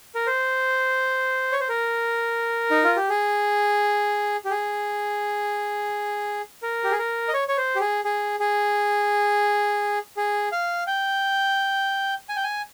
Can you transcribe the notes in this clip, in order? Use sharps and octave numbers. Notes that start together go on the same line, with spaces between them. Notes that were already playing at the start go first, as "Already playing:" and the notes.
A#4
C5
C#5
C5
A#4
D#4
F4
G4
G#4
G4
G#4
A#4
G4
G#4
A#4
D#5
C#5
C#5
C5
G4
G#4
G#4
G#4
G#4
F5
G5
G#5
G5
G#5